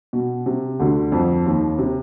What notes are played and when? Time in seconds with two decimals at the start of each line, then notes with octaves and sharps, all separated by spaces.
0.13 B2
0.46 C3
0.79 D2 D3
1.12 F2 F3
1.46 D#2 D#3
1.79 C3